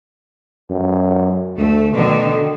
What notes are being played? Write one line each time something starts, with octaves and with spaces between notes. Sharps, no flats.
F#2
D2 A3
B2 D3 D#3